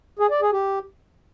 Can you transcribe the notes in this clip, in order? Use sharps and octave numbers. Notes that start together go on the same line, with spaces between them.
G#4
D5
G#4
G4